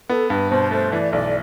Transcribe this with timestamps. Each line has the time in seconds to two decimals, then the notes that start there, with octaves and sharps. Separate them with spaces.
0.09 B3 A4
0.30 G2 B4
0.51 B2 C5
0.71 A3 C5
0.92 E3 D5
1.13 B1 D5